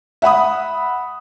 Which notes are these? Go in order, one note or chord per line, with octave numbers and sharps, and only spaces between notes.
E5 F#5 B5 D#6